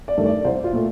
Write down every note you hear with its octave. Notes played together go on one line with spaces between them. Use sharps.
D5
G2 D#3 A3
D5
C2 C5
F4
A#2 A3